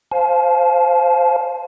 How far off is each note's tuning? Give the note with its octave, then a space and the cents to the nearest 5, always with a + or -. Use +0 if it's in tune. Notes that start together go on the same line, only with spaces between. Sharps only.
C5 -5 F5 +5 A5 -40